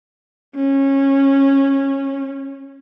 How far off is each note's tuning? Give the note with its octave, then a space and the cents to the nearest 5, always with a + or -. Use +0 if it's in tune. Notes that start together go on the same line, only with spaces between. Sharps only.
C#4 -20